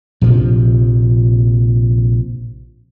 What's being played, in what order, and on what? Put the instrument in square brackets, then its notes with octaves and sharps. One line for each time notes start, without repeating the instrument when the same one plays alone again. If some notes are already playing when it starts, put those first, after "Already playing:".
[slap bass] A#1 C3 F3